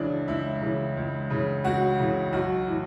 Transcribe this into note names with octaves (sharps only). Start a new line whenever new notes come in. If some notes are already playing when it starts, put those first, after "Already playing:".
Already playing: C#2 C#3 E3 D4
C#2 E4
C#3 E3
C#2
C#3 E3
C#2 F#4
C#3 E3
B1 F#4
A2 E3